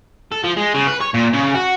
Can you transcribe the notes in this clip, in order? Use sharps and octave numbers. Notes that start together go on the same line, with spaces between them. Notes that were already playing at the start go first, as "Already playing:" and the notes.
A4
F3
G#3
C#3
B4
C#5
A#2
C#3
F#4